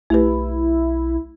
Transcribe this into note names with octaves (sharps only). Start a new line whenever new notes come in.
B1 A3 E4 G4 B4